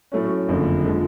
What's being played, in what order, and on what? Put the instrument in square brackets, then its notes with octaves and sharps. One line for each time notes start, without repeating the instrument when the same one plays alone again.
[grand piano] A2 F#3 A3 C#4
F#1 F2 D3
D3 F3 G#3